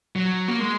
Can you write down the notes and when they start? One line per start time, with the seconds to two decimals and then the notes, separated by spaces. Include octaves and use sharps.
0.16 F#3
0.48 A#3
0.60 G#3